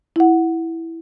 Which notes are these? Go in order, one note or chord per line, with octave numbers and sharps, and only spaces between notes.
E4 F#5